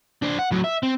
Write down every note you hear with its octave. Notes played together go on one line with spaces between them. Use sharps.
D4 C5
F#5
A2 F#3
E5
C4